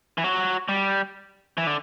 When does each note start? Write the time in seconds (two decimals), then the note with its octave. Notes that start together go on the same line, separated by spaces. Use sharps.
0.18 E3
0.24 F#3
0.69 G3
1.58 E3
1.67 D3